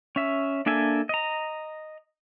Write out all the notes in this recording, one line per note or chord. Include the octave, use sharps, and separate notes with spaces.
C#4 E5
A#3 D4 A4 E5 G#5
D#5 A#5